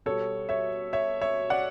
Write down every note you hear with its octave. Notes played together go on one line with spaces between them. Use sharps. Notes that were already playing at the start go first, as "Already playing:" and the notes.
B2 G3 A4 C#5
C#5 E5
C#5 E5
C#5 E5
D5 F#5